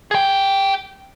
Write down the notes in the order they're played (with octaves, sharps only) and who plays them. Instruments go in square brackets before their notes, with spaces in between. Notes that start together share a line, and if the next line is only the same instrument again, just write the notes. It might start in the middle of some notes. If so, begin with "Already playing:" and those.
[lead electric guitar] G#4 G5